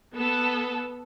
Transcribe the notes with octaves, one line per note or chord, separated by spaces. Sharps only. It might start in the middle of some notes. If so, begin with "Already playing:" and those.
B3 A4